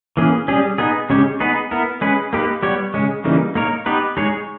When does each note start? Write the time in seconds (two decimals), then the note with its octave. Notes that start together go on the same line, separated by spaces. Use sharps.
0.17 E3 A#3 C#4 G#4
0.48 G3 C#4 G#4
0.78 B3 D#4 G#4
1.10 C#3 G#3 C#4 G4 C#5
1.40 B3 D#4 G#4 B4
1.71 B3 E4 A#4
2.01 G#3 C#4 G#4 B4
2.33 A#3 D#4 G4 B4
2.63 G3 B3 G4 C#5
2.94 C#3 G#3 C#4
3.24 C#3 E3 G3 A#3 D#4
3.55 A#3 D#4 A#4 C#5
3.86 B3 D#4 G4 B4
4.17 G#3 D#4 G#4 C#5